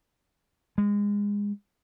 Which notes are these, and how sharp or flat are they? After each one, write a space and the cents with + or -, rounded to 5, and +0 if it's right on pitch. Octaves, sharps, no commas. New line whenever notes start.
G#3 -25